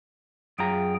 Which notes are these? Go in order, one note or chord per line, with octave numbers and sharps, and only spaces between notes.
F#2 F4 G#4 G5 A#5